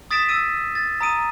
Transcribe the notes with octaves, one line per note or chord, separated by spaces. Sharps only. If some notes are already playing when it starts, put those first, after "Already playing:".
D#6 A6 B6 D7 E7
E6 D7 D#7
A6
A#5 D#6 D7 D#7